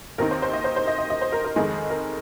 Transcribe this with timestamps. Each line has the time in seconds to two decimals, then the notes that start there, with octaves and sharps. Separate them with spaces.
0.18 D#2 D#3 C4 D#4 A#4
0.31 C5
0.42 C5
0.53 D#5
0.64 C5
0.76 C5
0.87 D#5
0.98 D#5
1.10 D#5
1.21 C5
1.32 A#4
1.44 A#4
1.56 F2 D#3 G#3 D#4 G#4
1.90 A#4